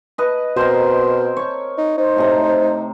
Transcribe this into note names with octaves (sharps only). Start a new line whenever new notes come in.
B4 D#5
B2 C4 A#4 C5
C#5 C#6
D#4
D#4 C5
A2 C3 A#5